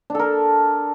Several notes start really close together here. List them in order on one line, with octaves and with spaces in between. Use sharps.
D4 A4 A#4